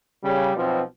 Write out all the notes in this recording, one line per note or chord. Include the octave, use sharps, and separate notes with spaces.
C#3 G3
B1 B2 F3 C4